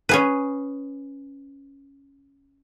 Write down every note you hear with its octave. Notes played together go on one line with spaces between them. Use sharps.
C#4 G#4 B4